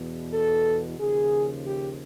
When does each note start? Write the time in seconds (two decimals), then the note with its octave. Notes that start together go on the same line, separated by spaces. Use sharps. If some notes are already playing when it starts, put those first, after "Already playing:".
Already playing: E2 B2
0.33 A4
0.99 D#2 C#3 F3 G#4
1.66 G4